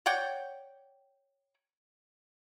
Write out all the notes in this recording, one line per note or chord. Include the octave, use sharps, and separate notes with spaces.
C#5 D5 F#5 G5